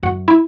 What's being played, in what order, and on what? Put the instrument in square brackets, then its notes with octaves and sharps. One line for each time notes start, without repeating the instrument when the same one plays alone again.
[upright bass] F#2 [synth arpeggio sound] F#4
[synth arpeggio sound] E4